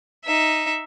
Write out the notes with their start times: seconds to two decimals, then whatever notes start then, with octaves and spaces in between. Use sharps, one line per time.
0.24 D#4 E5